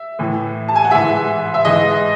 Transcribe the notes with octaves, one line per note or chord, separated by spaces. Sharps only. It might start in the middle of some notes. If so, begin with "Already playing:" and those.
Already playing: E5
A2 E3
A5
G#5
F#5
G#2 E3 E5
E5
G#2 E3 D#5